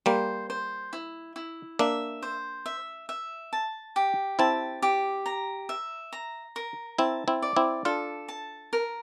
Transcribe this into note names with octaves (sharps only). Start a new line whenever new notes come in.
G3 A#3 C5
C5
E4
E4
A#3 D4 E5
C5
E5
E5
A5
G4
C4 E4 A5
G4
A#5
E5
A#5
A#4
C4 E4 A5
C4 E4
D5
C4 E4
D4 F4 A4
A5
A#4